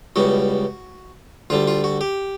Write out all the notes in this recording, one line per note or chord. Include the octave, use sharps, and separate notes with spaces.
C#2 B2 G3 F#4
D2 D3 G3 F4
F4
F#4
G4